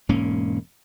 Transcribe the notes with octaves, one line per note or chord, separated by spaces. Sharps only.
E1 G#2 A#3 C#4